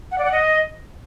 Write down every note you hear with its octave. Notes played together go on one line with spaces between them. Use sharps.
F#5
D5
F#5
D#5